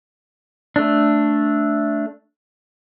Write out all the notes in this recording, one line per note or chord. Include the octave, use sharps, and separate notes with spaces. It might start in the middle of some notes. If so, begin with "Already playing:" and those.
A3 D4